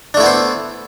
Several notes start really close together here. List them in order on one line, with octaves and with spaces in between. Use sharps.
D4 A3 E4 B3 C5